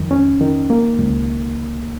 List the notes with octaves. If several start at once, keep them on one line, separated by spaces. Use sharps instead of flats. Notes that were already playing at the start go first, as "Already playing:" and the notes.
Already playing: F2 D#3
C#4
D#3
A#3
C#2